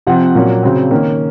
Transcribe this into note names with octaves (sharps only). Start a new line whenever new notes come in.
C3 F3 C4 F#5
A#2 F#3 A#3 C#4
C#3 F#3 C4
D#3 A#3 C#4